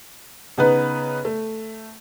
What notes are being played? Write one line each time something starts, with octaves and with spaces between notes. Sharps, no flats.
C#3 B3 D#4 B4
A3